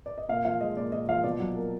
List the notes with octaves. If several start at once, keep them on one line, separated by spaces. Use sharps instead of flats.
D5
D#5
A#2 F5
F3 F5
G#3 D#5
A#2 D5
A#2 D#5
F3 F5
B2 D5
F#3
A#3